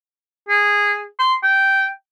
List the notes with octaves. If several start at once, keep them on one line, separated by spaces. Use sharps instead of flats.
G#4
C6
G5